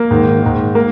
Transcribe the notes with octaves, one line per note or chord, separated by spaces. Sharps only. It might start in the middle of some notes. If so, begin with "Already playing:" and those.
Already playing: A#3
G#2 D#3
G#2 D#3
A#3